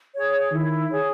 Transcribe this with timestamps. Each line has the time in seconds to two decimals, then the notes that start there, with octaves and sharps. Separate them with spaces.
0.14 G#4 C#5
0.51 D#3 E4
0.90 G#4 C#5